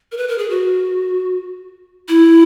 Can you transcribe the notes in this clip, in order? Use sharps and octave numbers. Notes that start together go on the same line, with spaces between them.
A#4
B4
A#4
G#4
F#4
E4